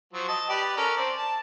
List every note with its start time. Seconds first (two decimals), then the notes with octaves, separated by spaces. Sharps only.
0.13 F3 F#3
0.28 D#5 A5
0.50 G4 B4 D5
0.77 C#4 A4 A#4
0.97 C4 D5
1.17 A5